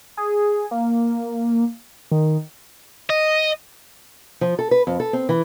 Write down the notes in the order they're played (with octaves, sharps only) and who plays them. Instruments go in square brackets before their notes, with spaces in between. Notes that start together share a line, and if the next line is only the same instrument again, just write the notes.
[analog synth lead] G#4
A#3
D#3
[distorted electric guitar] D#5
[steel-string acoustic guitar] F3
A4
B4
F2
A4
C4
E3